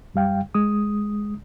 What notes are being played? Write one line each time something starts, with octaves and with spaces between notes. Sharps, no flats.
F#2 G3 F5 G5
G#3 D#6